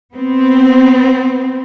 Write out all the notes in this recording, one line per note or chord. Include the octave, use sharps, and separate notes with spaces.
B3 C4